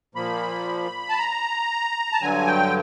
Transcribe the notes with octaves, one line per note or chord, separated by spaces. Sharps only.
A#2 F3 A#3 B5
A5
A#5
A5
G2 D3 F#3 G#5
G5